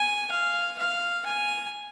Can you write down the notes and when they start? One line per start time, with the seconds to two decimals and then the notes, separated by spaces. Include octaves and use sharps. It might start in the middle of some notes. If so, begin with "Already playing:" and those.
Already playing: G#5
0.32 F5
0.78 F5
1.26 G#5